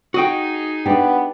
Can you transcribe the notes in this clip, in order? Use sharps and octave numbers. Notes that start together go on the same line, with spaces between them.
D#4 F#4 G#4 D#5 G5
B3 D4 G4